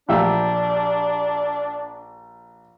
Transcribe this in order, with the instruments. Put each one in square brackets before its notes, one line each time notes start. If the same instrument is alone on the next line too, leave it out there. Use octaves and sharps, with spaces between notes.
[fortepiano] A#1 G4 E5 [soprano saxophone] D4